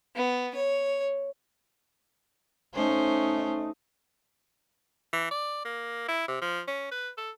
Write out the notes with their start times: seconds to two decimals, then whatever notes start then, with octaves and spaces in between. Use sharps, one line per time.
0.16 B3
0.55 C#5
2.74 A3 C#4 D#4 C5
5.13 E3
5.31 D5
5.65 A#3
6.08 E4
6.28 C3
6.41 F3
6.67 C#4
6.91 B4
7.18 A4